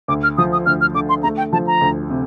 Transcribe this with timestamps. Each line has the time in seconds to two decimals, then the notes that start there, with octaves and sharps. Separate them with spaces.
0.08 D2 D6
0.23 F6
0.37 F3 D#6
0.53 D#6
0.66 D2 F6
0.81 F6
0.94 D3 D6
1.09 C6
1.23 A3 A#5
1.37 G5
1.53 F3 A5
1.67 A#5
1.81 D2
2.10 C3